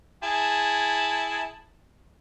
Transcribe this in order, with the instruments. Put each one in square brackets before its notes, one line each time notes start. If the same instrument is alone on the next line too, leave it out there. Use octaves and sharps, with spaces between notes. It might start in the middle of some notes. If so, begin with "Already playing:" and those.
[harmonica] E4 G#4 A5